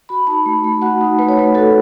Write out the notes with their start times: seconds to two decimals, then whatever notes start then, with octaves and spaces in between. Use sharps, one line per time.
0.09 F#4 B5
0.27 D#4 A5
0.46 A3
0.64 A3
0.82 F#4 F#5
1.01 D#4
1.19 A3 B4
1.29 C#5
1.37 A3 B4
1.54 F#4 A4